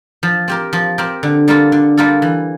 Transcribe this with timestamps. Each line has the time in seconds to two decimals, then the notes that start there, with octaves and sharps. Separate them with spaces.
0.23 F3
0.48 C4 G4 A#4
0.73 F3
0.98 C4 G4 A#4
1.23 D3
1.48 G3 A#3 F4 A4
1.72 D3
1.97 G3 A#3 F4 A4
2.22 E3